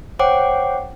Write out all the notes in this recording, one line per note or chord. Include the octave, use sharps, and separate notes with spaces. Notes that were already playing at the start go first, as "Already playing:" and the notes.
C5 C#5 F#5 G5 D6